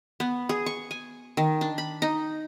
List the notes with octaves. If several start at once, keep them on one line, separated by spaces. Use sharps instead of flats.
B3
G#4
C#6
G#5
D#3
D4
B5
D#4